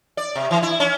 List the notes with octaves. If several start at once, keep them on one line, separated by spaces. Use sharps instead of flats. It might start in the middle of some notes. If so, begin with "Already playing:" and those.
D5
C3
E3
E4
C#4